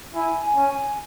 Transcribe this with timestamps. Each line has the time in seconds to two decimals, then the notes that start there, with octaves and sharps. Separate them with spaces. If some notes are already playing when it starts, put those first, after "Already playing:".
0.14 E4 G#5
0.41 G#5
0.55 C#4
0.69 G#5